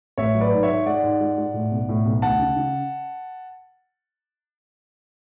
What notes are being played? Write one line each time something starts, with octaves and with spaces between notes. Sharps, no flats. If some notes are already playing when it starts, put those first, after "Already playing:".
A1 C#5 E5
F#3
B4 D5
G#2
C#5 E5
G#2
G#3 D5 F#5
G#2
G#3
G#3
A2
B1
A2
B1
D2 F#5 A5
C#3
C#3